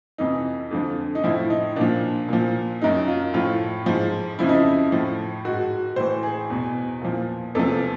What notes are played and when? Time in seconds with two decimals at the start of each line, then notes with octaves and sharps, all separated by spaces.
0.18 F2 C3 E3 D#4
0.71 F2 D3 F3
1.15 D#4
1.24 A2 F3 E4
1.50 D#4
1.76 A#2 F3 D4
2.29 A#2 F3
2.82 F#2 D#3 D#4
3.08 F4
3.34 A2 F3 F4
3.86 G#2 F3
4.39 F2 C#3 F3 E4
4.49 D#4
4.60 E4
4.92 A2 F3
5.45 G#2 D#3 F#4
5.96 A2 E3 C5
6.23 G#4
6.50 E2 B2
7.01 A#2 F3
7.55 E2 C3 F3 A4